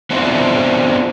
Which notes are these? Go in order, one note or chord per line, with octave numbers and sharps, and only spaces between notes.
B3 C4 D4 E4 F4 C5